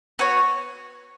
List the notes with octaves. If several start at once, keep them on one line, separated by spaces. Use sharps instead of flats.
B3 F#4 C#5